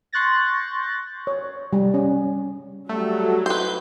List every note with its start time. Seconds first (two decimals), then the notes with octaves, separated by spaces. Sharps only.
0.13 C6 C#6 F#6 G6 A6 A#6
1.27 C#5
1.73 G3
1.94 C#4
2.89 F#3 G3 A3 F#4
3.46 C4 D#4 E4 B4 C5 G6